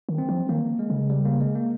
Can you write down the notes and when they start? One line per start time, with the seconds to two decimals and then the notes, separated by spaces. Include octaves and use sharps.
0.09 D#3
0.18 C4
0.29 F3
0.49 D#3 A#3
0.79 G#3
0.90 C#3
1.10 G3
1.25 A#3
1.40 G#3
1.55 A#3